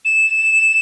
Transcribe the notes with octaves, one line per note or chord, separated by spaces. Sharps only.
E7